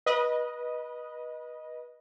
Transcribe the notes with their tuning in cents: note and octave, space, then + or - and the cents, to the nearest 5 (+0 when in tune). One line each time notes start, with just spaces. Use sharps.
B4 -25 D#5 +0